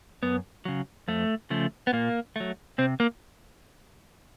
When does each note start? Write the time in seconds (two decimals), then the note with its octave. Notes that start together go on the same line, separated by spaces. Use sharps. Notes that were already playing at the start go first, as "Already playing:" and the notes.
0.23 F#2 B3
0.65 C#3 F#3
1.08 F2 A3
1.50 C#3 F3 A3
1.87 B3
1.93 A#2 A#3
2.36 F#3 A3
2.78 C3 C4
3.00 A#3